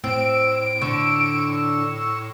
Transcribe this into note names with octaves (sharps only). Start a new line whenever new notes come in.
A2 C4 E6 D7
D3 C#6 E6